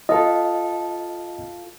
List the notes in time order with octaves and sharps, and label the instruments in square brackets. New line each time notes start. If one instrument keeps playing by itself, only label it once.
[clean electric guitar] F4 A4 [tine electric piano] D#5